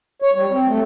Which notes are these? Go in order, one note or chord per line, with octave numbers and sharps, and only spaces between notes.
C#5
G3
C4
A3